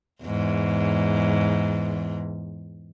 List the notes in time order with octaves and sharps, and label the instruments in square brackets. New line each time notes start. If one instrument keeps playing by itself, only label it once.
[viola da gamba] E2 G#2